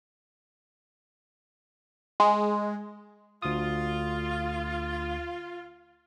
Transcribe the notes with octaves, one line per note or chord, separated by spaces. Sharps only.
G#3
D2 F4 D#6